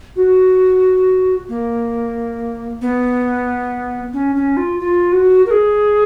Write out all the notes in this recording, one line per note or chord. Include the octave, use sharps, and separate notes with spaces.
F#4
A#3
B3
C#4
C#4
F4
F4
F#4
A#4
G#4